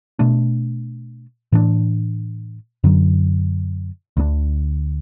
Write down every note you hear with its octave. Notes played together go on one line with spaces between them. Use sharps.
B2 A3 D4
A2 E3 D4
F#2 D3 F#3
D2 D3 A3 D4